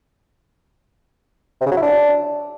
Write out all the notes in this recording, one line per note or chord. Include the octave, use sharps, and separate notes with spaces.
C3
C#3
F#3
E4
D4